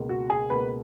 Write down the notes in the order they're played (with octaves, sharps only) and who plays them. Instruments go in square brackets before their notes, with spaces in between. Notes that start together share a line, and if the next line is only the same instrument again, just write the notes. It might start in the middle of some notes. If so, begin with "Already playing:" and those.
Already playing: [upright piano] C#2 B2 A#3
F#4
G#4
C#2 B2 A#3 B4